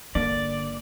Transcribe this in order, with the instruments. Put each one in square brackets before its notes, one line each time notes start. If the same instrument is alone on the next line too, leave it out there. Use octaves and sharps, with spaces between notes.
[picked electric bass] G1 A#3 D4 [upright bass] D3 [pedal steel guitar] D5